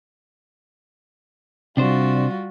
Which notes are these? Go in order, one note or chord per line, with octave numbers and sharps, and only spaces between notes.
C3 G3 D4 F4 F#4 C5